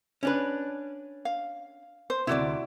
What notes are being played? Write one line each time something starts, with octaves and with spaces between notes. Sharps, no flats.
C#4 D4 B4
F5
C5
D2 G2 C3 E4 F#4 D5